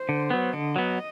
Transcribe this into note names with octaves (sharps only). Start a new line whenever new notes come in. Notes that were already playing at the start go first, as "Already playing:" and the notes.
Already playing: C5
D3
F#3 B3
D3 D#5
F#3 B3